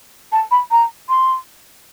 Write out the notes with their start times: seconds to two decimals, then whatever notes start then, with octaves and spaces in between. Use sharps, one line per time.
0.32 A5
0.51 B5
0.71 A#5
1.09 C6